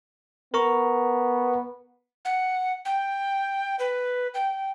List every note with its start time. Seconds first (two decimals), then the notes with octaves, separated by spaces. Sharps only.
0.54 B3 A#4 A#5 C#6
2.25 F#5
2.85 G5
3.79 B4
4.34 G5